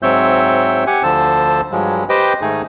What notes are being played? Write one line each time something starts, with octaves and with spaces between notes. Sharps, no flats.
G#2 F#3 C4 C#5 E5 G6
G4 F#5 G#5
D2 D3 F3 C5 A5 E6
G2 F3 F#3 G#3
G4 B4 C5 D#5 G5
G#2 D#3 A3 D#4 G#4